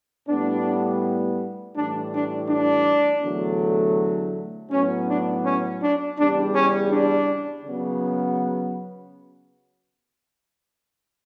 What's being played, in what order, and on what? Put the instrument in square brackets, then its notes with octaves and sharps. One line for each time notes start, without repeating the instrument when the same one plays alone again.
[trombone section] A2 G3 B3 D4
A2 E3 G3 D4
D4
D4
E2 D3 F#3 A3
A2 F#3 B3 C#4
D4
C#4
D4
E2 C#3 G3 D4
C#4
D4
C#3 F#3 B3